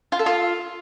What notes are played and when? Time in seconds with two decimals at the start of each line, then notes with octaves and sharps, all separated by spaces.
0.12 F4
0.19 A4
0.26 F4